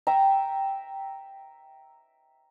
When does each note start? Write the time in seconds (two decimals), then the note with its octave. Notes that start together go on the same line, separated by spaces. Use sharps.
0.07 E5 G5 A#5